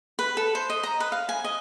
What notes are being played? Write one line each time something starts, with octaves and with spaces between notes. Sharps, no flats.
B4
A4
C5
D#5
A#5
B4
F5
G#5
D#5